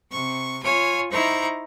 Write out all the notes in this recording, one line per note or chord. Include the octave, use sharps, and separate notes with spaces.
C3 C#6
F4 C#5 G#5
D#4 E4 C5 A#5 C#6